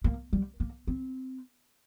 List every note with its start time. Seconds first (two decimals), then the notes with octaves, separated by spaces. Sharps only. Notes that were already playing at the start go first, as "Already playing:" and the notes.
0.04 A#3
0.33 G3
0.60 A#3
0.87 C4